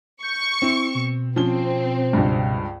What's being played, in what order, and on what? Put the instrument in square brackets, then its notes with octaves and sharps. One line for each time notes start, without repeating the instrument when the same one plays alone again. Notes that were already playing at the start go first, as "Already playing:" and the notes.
[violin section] C#6 [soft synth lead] G6
[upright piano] C4 [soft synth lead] E4
[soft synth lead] B2
[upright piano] F3 C#4 G7 [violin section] C4
[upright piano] C#2 G2